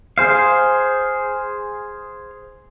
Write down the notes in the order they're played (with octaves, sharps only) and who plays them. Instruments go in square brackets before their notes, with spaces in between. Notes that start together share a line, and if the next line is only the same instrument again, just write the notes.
[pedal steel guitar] G#4 C5 F5